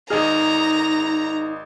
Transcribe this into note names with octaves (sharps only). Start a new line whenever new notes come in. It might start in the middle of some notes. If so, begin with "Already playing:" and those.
G#1 D#4 G#4 D#5 A#5 F6